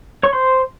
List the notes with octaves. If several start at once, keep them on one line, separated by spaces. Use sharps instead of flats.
C#5 C#6
C5 C6